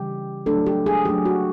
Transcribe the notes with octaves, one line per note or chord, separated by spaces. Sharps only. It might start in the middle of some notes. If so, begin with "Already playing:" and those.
Already playing: C#3 E3 G3 G4
F#3 A3 D4 A4
G4
G#4
F#3 A3 D4 G4
F#4